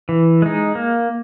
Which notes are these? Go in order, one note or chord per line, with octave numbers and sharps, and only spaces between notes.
E3
G#3 D#4
A#3